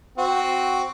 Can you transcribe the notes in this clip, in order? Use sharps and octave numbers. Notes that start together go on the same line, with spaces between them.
C4 F#4